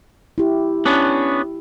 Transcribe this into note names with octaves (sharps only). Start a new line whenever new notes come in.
E4 G4
B3 C#4 D4